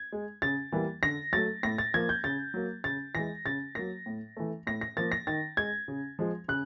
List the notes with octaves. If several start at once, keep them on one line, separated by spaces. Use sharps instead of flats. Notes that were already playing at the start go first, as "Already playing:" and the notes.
Already playing: G#6
G#3
C#3 A6
E3 G3 A#3
D3 A#6
F#3 A3 A6
A2 A#6
A6
F3 A#3 G#6
G6
C#3 A6
F#3 A#3
C#3 A6
E3 G#3 A#6
C#3 A6
F#3 A#3 A#6
A2
E3 A3
A2 A#6
A#6
F3 A#3 A6
A#6
D#3 A6
G#3 G#6
C#3
F3 G#3
C#3 F#6